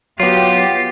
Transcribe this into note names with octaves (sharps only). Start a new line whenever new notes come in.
F#3 B3 F4 G4